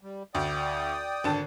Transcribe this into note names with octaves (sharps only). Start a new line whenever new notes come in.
G3
D2 D5 G5 D#6
G#1 D3 A5